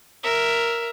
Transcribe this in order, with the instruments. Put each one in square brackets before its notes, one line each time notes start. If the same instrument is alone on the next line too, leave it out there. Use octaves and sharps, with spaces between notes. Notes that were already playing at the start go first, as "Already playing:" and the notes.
[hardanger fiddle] A#4 E5